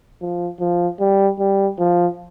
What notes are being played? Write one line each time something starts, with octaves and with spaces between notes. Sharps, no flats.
F3
F3
G3
G3
F3